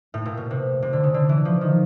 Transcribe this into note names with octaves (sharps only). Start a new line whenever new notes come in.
A2
A#2
B2
C3
C3
D3
C#3
D3
E3
F3
D#3